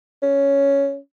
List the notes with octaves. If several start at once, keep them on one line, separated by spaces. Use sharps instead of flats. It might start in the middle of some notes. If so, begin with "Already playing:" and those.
C#4